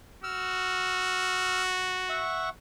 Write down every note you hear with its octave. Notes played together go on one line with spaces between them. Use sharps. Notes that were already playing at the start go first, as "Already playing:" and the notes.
F#4 E6 F6
E5 F#5 C#6